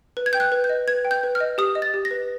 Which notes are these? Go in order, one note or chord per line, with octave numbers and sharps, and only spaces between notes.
B4
G#6
G5 G6
F#6
B4
G6
D#5
B4 G#6
G5
G6
B4
F6
D#5
G4 D#6
D#5
A6
G4
A#6
B4